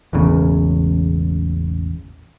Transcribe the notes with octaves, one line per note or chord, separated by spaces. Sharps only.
E1 A1 E2 C#3